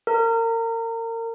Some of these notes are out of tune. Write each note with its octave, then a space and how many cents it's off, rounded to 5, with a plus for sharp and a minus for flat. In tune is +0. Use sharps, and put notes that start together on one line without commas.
A#4 -30